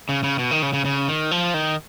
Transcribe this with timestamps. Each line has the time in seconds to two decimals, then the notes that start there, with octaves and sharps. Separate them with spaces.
0.09 C#3
0.24 C#3
0.39 B2
0.51 D#3
0.62 C#3
0.74 C#3
0.85 C#3
1.08 D#3
1.31 F3
1.54 D#3